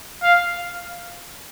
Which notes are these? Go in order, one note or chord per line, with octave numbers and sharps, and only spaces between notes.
F5